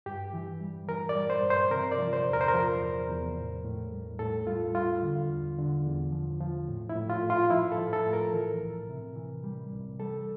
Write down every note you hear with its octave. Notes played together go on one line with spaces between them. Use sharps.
G2 G4
E3
G3
E3 A#4
D5
G3
C5
G2
C5
C3 A#4
D5
F3
C5
E2
A#4
C5
A#4
F3
E2
E2
A2
A2
G3
A2 A4
G3 F4
G3 F4
D3
E2
D3
E2
F3
F3
A2
E4
A2
F4
A2
F4
F3 E4
A4
F3
A4
A2
A#4
E3
C2
C3
E3
G3
C2
G3 A4